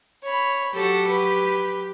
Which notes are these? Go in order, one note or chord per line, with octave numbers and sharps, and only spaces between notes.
C#5 B5
F#3 F#4 G4 A4
B4